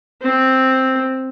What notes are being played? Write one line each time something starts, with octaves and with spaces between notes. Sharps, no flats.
C4